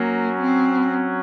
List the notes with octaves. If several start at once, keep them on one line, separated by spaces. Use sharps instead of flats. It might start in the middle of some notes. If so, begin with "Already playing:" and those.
Already playing: F#3 A#3 C#4 F#4
C4